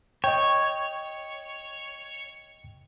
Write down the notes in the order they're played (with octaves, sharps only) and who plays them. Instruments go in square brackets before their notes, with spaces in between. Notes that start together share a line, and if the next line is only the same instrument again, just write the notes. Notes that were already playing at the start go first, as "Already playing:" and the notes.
[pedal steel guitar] C#5 [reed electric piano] D#5 G5